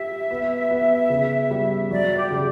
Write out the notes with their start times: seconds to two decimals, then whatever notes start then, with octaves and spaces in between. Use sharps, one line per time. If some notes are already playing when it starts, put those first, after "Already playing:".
Already playing: G4 E5
0.31 B3
0.71 B3
1.10 C#3
1.51 G3
1.90 F#3 D5
2.17 G4
2.31 C#3